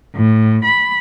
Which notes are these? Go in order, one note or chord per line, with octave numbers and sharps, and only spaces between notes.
A2
B5